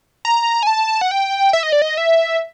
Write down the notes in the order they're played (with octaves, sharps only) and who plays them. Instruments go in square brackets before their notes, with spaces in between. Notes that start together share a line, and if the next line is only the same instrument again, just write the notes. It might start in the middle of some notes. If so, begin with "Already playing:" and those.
[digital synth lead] A#5
G#5
A5
F#5
G5
E5
D#5
D5
D#5
E5